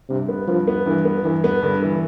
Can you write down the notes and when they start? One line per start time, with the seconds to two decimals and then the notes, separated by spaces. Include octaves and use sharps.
0.09 G2 C3
0.29 B3
0.47 G2 F3
0.67 B3
0.86 G2 E3
1.05 B3
1.24 G2 E3
1.44 B3
1.63 G2 D3
1.82 E3